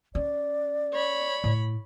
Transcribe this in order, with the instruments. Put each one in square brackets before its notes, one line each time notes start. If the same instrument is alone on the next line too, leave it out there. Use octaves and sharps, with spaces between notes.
[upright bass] C#4 [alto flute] D5
[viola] C#5 B5
[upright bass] A2